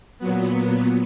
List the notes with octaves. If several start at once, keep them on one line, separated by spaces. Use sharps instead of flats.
A#2 F#3 B3